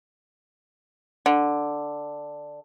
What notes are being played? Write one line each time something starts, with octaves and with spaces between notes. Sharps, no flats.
D3